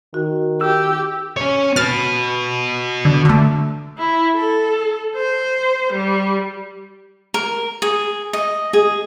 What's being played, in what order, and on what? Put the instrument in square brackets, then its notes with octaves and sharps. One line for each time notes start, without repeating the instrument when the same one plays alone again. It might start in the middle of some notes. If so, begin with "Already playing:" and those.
[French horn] D#3 [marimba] F#4
[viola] G4 [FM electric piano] E6
[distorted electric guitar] C#4 C#5
[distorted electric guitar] F#4 B4 [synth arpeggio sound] F6 A6
[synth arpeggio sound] D3
D3 A3
[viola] E4
A4
C5
G3
[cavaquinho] A#4
G#4
D#5
G#4